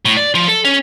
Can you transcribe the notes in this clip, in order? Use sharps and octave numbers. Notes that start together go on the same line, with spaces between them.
A2
D5
F3
A4
C#4